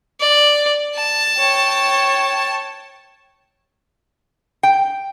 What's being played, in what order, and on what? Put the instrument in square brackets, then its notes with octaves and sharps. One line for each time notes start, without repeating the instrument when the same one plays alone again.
[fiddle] D5
A5
[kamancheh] C#5 G5
[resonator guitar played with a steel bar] G5